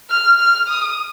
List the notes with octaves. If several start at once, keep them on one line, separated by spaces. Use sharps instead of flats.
F6
F6
D#6